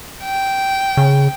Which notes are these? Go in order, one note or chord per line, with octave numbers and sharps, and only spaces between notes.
G5
C#3